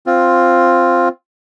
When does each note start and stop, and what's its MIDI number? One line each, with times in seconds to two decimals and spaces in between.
0.06 1.08 60
0.06 1.08 65